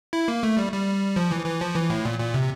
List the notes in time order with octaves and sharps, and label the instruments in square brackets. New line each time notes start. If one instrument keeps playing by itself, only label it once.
[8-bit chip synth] E4
A#3
A3
G3
G3
F3
E3
E3
F3
E3
A2
A#2
A#2
C3